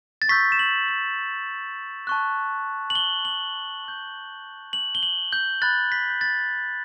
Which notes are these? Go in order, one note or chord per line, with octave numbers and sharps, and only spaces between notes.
A6
C#6 E6 G6 B6
E7
F#7
F#7
A5 C#6 F#6
F#7
G7
F#7
C#6 G6
F#7
G7
F#7
G6
B5 F#6 A6
B6
G6
A6